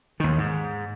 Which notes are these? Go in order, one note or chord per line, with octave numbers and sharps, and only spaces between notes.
D#2 D#3
G#2